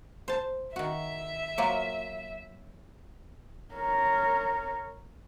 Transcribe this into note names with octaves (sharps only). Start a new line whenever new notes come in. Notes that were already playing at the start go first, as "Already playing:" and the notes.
C5 A5
D#3 F#4 E5
F#3 A#3 F4
A#4 C#5